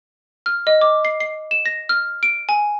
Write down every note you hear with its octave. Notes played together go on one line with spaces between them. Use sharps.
F6
D#5
D6
C7
C7
E7
A#6
F6
D7
G#5